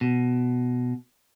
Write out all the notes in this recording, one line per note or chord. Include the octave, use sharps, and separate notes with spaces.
B2